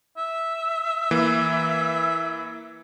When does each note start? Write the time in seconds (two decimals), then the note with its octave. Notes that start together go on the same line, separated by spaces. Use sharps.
0.17 E5
1.11 E3 A#3